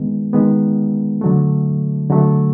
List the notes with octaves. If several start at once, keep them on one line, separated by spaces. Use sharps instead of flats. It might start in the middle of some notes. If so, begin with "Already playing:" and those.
Already playing: D#3 G#3 B3
D#3 G#3 B3
D3 F#3 A3
D3 F#3 A3